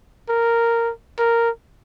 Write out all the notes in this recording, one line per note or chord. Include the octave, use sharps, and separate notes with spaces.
A#4
A#4